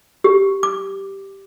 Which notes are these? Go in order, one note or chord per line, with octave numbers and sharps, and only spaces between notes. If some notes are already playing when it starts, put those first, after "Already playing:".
G4
D6